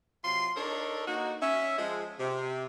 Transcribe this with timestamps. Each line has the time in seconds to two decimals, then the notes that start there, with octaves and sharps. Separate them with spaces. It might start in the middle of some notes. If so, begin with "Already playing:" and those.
0.24 C3 F#3 F4 C6
0.56 D4 D#4 A4 A#4 C#5
1.08 A#3 D#4 F#4
1.42 C#4 E5
1.78 F3 G#3
2.19 C3